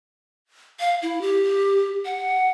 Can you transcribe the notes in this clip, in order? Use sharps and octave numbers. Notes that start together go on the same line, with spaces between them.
F5
E4
G4
F#5